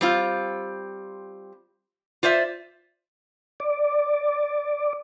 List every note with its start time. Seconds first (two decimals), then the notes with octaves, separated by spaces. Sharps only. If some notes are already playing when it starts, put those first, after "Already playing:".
0.01 G3 C4 F4
2.23 F4 C5 D5 E5
3.60 D5